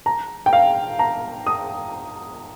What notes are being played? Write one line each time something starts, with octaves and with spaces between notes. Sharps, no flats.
A#5
G5
F5
A#5
D#6